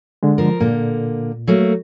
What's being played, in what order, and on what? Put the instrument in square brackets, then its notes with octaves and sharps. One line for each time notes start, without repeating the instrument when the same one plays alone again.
[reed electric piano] D3 G#3
[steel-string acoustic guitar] F3 A#4
[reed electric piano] A#2 [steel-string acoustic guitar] D3 A#3
[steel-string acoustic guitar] F#3 A3 A#3